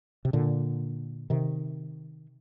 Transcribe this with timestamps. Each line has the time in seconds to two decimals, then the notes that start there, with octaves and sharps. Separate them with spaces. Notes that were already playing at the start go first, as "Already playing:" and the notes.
0.25 C3
0.33 A#2 D3
1.30 C3 D#3